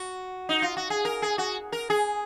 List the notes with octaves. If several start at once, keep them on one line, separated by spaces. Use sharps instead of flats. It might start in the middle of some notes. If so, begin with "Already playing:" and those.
Already playing: F#4
D#4
F4
F#4
G#4
A#4
G#4
F#4
A#4
G#4